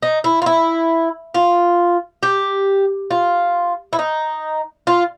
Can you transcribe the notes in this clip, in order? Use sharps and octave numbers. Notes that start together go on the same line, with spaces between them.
D#4
E4
F4
E4
F4
G4
F4
E4
D#4
F4